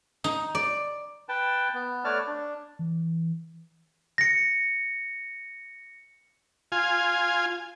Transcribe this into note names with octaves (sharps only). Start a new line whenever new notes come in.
D#4
D5
B4 G5 A5
B3
A3 B4 C#5 D5 A5 F6
D4
E3
A#6 C#7
F4 G#5